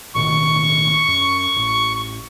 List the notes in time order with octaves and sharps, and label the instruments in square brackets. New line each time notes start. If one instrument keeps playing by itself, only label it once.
[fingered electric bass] A1 B2 D#3 [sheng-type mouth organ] C#6
[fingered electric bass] F#2
A1